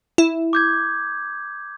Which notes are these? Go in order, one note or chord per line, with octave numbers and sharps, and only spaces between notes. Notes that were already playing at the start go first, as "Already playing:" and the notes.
E4
D6 G6 G#6